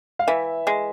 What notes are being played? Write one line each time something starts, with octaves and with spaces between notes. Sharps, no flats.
F5
E3 E5
G#3